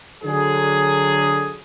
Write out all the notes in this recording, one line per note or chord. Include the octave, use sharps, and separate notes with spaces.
D3 F#3 G#4